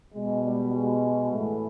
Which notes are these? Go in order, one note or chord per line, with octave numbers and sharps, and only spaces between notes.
B2 G#3
G3
G#3
A2 E3 A3